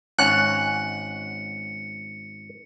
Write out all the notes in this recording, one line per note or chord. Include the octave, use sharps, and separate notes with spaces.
G#1 C#4 F#5 F#6 C#7